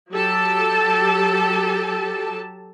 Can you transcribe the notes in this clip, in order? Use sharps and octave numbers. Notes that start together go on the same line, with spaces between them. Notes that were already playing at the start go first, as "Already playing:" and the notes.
F#3 G4 A4 A5